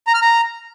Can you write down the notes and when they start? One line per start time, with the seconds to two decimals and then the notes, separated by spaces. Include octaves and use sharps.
0.07 A#5
0.14 F6
0.22 A#5